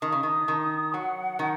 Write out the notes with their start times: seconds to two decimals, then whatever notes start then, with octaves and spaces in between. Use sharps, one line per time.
0.02 D#3 D#6
0.12 C#3
0.23 D#3
0.48 D#3
0.93 F#3 F#5
1.39 D#3